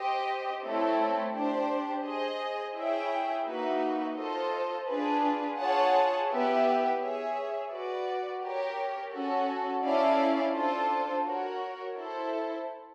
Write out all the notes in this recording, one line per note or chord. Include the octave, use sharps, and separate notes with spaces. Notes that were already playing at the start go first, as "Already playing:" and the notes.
Already playing: G4 C5 D#5
A3 C4 E4 A4 C#5
D4 G4 C5
G#4 C5 D#5
E4 G#4 C#5 E5 G5
A#3 D#4 F#4 B4 E5
F4 A4 C5 D#5
D4 F4 G#4 B4
F4 G#4 C#5 F#5 A5
B3 E4 G4 B4 E5
G#4 C#5 E5
F#4 B4 D5
G4 A#4 C#5
C#4 F#4 A4
C#4 E4 A4 D5 F5
D4 F4 A4 C5
F#4 A#4 C#5
E4 A4 C5